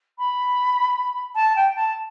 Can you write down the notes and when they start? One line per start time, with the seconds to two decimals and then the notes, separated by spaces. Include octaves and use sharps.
0.18 B5
1.35 A5
1.56 G5
1.75 A5